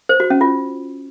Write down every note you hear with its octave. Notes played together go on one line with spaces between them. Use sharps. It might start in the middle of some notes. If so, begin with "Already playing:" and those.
C5
F#4
C#4
F4